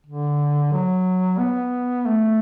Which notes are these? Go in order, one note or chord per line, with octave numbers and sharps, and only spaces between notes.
D3
F#3
B3
A3